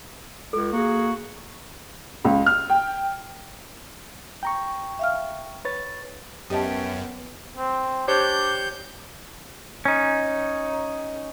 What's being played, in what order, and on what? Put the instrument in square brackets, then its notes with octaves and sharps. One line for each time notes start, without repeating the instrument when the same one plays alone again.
[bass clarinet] C#2 [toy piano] A4
[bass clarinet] A#3 [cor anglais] F#4 [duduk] G#4
[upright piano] C#2
F6
G5
[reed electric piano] G5 A#5 C#6
[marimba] E5 F5 F6
[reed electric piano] B4 C#5 A6
[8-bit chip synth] F#2 [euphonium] B3 [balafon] G4 D#5 A5 [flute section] C#5 E5 G5
[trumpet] C4
[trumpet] D4 [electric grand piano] G4 C5 C#5 [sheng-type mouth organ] G6
[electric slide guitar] C#4 D#4